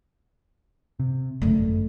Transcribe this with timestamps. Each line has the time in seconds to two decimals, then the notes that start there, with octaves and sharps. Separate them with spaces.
1.00 C3
1.42 G#1 F#2 D3 A3